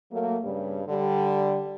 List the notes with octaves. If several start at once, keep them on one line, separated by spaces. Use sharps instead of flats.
F#3 A3 A#3
G2 C#3 G3
D3 G3